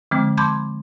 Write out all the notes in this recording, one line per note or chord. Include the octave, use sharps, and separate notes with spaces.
D3 F3 G#3 C4
A5 B5 C6 D6 G6 G#6